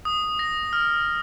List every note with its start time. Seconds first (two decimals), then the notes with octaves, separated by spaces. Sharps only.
0.05 D#6
0.39 A#6
0.73 F6